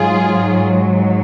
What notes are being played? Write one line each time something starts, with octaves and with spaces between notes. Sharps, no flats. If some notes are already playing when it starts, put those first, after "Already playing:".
Already playing: G#2 F#3 F4 G#4